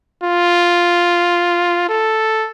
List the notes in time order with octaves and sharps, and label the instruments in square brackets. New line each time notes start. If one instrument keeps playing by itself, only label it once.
[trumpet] F4
A4